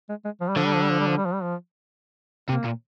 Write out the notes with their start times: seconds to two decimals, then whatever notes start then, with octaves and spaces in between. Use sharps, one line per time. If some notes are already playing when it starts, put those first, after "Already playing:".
0.09 G#3
0.25 G#3
0.41 F3
0.49 G3
0.57 D3 F3
0.66 G3
0.75 F3
0.83 G3
0.91 F3
1.00 G3
1.08 F3
1.17 G3
1.25 F3
1.34 G3
1.42 F3
2.49 C3 A#3
2.65 A#2